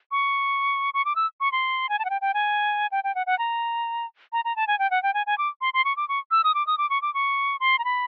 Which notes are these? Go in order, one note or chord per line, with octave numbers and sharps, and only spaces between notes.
C#6
C#6
D6
E6
C#6
C6
G#5
A5
F#5
G5
G5
G#5
G5
G5
F#5
F#5
A#5
A#5
A#5
A5
G#5
G5
F#5
G5
G#5
G#5
D6
C6
C6
C#6
D6
C#6
E6
D#6
D6
D#6
D6
C#6
D6
C#6
C6
A#5
B5